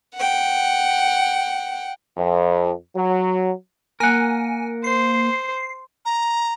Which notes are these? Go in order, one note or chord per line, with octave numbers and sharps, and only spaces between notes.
F#5 G5
F2
F#3
A#3 A#4 F#5 G#5
C5 C7
A#5